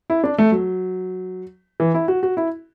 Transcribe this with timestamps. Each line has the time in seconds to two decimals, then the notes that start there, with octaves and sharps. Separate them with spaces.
0.10 E4
0.24 D4
0.38 A3
0.52 F#3
1.80 E3
1.94 E4
2.08 F#4
2.23 F#4
2.37 E4